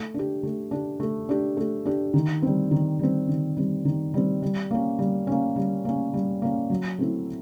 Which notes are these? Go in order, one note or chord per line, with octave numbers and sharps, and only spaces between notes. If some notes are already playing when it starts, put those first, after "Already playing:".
Already playing: A3
D4 G4
A3
D4 G4
A3
D4 G4
A3
D4 G4
D#3
G3 C4
D#3
G3 C4
D#3
G3 C4
D#3
G3 C4
G3
A#3 C#4
G3
A#3 C#4
G3
A#3 C#4
G3
A#3 C#4
F#3
A3 C4 E4